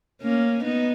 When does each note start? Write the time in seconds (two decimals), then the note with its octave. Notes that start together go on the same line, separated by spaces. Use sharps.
0.22 A#3 C#4
0.64 B3 D#4